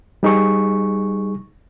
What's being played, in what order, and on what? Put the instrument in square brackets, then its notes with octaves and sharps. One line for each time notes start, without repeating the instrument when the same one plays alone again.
[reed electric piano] G3 D#4 G#4 C#6